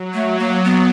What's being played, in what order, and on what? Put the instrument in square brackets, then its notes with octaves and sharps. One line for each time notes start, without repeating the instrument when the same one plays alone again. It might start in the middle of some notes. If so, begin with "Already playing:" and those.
Already playing: [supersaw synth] F#3
[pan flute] A3
A#3
B3